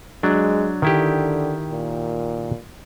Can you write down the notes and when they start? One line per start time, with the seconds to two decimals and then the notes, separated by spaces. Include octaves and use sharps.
0.23 F#3 G#3 D4
0.82 D3 D#3 E4 G4
1.71 A#2